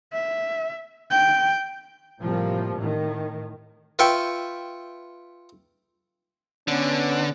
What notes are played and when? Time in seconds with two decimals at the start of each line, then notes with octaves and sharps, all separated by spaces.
0.13 E5
1.11 G5
2.21 A2 C3 F3 G3 A#3
2.76 A2 D#3
3.99 F4 B4 E5 G5 C#6
6.68 D3 B3 C#4